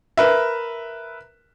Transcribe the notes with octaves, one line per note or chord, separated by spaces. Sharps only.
A#4 B4 E5